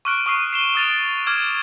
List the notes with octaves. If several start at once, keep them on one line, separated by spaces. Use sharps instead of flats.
C#6 D6 F6 F#6 D7
C#6 D#6 F6 C7 D#7
C7 E7 G7
D#6 F6 A6 D7 F7
D6 F6 G#6 E7